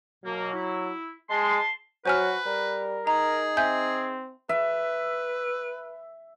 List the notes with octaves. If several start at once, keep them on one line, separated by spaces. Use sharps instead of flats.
B2 F#3 A#3
E4
G#3 A5 C6
F#3 F#4 B4 C5 G#5 F6
G3 A#4
D#4 G#4 A#5
C4 E5 G#5 G6
B4 E5